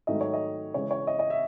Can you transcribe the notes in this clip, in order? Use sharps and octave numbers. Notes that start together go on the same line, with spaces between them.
G#2 D#3 F#3 A3 D#5
C#5
D#5
C#3 E3 G#3 C#5
C#5
D#5
D#5
E5